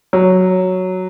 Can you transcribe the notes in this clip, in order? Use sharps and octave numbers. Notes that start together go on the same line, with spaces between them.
F#3